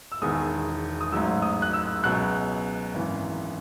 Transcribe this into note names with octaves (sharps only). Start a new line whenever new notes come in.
E6
E1 E2 D#3 D#6
D#6
A1 G#2 F#3 E6
D#6
F#6
E6
C#2 B2 F#3 F#6
G#1 F#2 E3